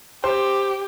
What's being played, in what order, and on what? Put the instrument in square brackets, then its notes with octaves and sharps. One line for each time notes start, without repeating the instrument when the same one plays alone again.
[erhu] G4 [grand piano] C5